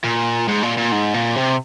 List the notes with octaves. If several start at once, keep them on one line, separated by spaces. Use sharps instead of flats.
A#2
G#2
A#2
A#2
G#2
A#2
C3